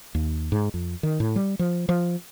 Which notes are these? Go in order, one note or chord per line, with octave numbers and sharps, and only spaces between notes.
D#2
G#2
F2
D#3
A2
G3
F3
F3